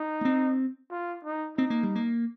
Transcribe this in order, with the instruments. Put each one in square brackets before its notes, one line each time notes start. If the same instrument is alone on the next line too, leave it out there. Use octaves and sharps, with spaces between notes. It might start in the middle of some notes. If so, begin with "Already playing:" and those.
Already playing: [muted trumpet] D#4
[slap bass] A#3
C4
[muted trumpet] F4
D#4
[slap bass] C4 [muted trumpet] D#4
[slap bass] A#3
G3
A#3